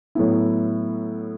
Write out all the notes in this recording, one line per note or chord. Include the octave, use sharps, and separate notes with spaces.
A2 F#3 B3 E4